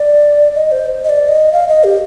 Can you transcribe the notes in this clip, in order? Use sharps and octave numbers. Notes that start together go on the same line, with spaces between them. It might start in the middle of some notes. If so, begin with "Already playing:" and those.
Already playing: D5
D#5
C5
D#5
D5
D#5
F5
D#5
G4